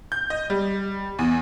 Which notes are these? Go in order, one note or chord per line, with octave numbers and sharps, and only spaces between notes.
G6
D#5
G3
E2